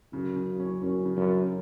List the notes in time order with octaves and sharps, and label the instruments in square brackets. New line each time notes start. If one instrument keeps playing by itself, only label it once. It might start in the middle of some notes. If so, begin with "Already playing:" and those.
[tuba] F#2 [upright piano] C#3
[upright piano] C#3
C#4
[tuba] F#2 [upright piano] C#4
[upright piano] C#3
[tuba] F#2
[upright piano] C#3